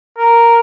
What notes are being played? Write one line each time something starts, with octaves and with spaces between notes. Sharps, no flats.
A#4